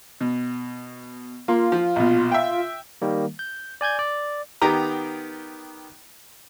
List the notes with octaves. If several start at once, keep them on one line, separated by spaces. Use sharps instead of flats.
B2
A#3 F4
F3
A#1 B2
E5 G5
D#3 G3 A#3
G6
D5 G#5 G6 G#6
D5
D#3 B3 G4 A#5